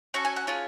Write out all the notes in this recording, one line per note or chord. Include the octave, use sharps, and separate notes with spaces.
C#4 F#4 A4 C#6
G#5
F#5
C#4 F4 G#4